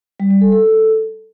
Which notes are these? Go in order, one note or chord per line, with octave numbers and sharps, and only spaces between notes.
G3
G3
A4
A4